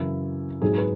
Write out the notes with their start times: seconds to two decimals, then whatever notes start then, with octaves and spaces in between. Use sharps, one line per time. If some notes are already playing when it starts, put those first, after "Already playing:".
Already playing: F#2 C#3 E3 E4
0.62 G#2 F#3 G#4
0.78 B4